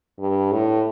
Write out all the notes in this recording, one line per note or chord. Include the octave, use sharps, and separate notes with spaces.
G2
A2